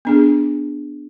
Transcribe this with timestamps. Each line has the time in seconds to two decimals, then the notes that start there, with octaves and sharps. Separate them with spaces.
0.05 B3 D4 G#4